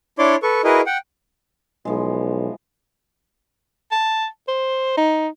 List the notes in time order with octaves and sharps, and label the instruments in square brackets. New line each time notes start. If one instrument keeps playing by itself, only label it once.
[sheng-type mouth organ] D4 E4 C#5 D5 C6 D6
A4 B4 C#6
E4 F#4 G#4 A#4 B4 D#5
F#5 G5
[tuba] B1 [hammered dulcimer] E3 F3 G#3
[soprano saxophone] A5
C5
D#4